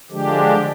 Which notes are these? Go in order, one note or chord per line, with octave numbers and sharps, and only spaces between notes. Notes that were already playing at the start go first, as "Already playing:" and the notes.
D3 F3 G#3 D4 G4